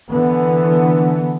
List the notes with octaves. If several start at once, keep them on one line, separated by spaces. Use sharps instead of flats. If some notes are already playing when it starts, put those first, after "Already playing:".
D3 E3 B3